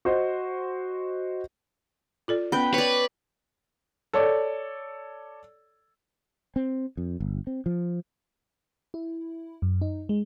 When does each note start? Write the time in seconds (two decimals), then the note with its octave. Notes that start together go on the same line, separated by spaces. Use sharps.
0.05 F#4 C5 D#5
2.28 F4 A4 D5
2.52 B3 C#4 B4 G5
2.74 B4 C#5 D5
4.13 A4 C#5 D5
6.56 C4
6.97 F2
7.20 G1
7.47 C4
7.66 F3
8.94 E4
9.62 F#2
9.81 D#4
10.09 G#3